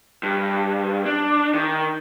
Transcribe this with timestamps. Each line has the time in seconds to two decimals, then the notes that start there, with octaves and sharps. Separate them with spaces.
0.23 G2
1.05 D4
1.54 D#3